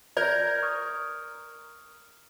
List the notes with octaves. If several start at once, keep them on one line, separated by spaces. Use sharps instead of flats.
A#4 D5 G6 G#6 A#6
C#6 D#6 F6